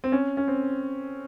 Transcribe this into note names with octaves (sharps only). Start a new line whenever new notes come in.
C4
C#4
C#4
C4